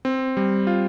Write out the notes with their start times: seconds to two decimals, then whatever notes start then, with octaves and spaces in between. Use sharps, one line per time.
0.05 C4
0.37 G3
0.67 F4